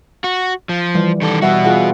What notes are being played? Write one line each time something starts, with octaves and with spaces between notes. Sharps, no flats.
F#4
F3
E3 G3
D#3 A4
B2 G3 F#4 E5 F#5
F4 G#4 F#5